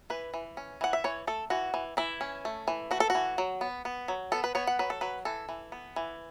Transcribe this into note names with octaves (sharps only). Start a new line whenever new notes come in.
E3 B4
E3
C#4
E3 F#5
E5
E3 C#5
A3 A4
E3 F#4
E3
E3 E4
C#4
A3
E3
A3 F#4
A4
F#4
E3
F#3
B3
B3
F#3
B3 A4
B4
B3 C#5
F#5
F#3 B4
A4
F#3 B4
E3 A4
E3
B3
E3